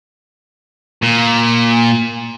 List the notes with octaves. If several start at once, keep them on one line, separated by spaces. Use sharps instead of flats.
A#2